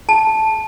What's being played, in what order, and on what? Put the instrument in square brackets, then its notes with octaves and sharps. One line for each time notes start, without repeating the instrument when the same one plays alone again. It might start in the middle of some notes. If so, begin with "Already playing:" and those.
[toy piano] A5